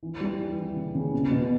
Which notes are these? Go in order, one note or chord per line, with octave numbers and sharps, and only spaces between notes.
E3
G3
E3
E3
C#3
C#3
B2
B2